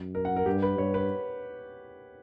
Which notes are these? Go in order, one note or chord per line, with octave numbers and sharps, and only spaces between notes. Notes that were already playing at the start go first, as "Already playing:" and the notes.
Already playing: F#2
A#4
F#5
A#4
G2 G4
B4
G2 C#5
B4